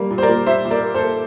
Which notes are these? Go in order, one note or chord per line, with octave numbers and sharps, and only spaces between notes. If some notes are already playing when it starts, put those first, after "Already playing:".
Already playing: G3 A#3
A#2
C5
A#4 D5
A#2
A#2 C5 E5
A#2
A#4 D5
A#3
A4 C5
A#3